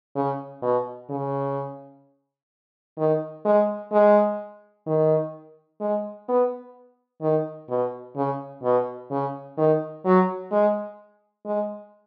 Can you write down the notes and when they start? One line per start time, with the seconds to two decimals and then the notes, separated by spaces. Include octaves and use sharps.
0.16 C#3
0.62 B2
1.10 C#3
2.98 D#3
3.45 G#3
3.93 G#3
4.87 D#3
5.81 G#3
6.29 B3
7.22 D#3
7.69 B2
8.16 C#3
8.63 B2
9.11 C#3
9.58 D#3
10.05 F#3
10.52 G#3
11.46 G#3